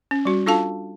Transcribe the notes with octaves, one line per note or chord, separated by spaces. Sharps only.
C#4
G3 F#4
D4 F4 A4 F5 A5